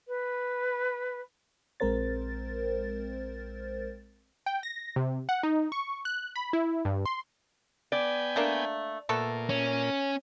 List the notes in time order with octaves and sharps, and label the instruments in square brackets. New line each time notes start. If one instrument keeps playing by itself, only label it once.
[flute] B4
[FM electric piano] A#1 G#3 C4 A#4 C5 A6
[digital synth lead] G5
A#6
C3
F#5
D#4
C#6
F#6
B5
E4
G2
C6
[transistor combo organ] B3 G5 G#5 [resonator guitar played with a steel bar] D5
[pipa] A3 A#3 D4
[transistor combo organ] A#2 [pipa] A3 B3 A4
[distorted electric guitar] C#4